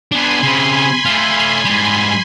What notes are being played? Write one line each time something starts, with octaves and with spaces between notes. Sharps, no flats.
B3 D4 G#5 B5 C6
C#3 C4
A3 F4
G#2 G3